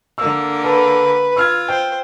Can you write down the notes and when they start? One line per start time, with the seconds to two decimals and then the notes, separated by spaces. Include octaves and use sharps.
0.18 D3 A#3 E6
0.64 A4 B4
1.36 F4 E6 F6 G#6
1.68 C5 G5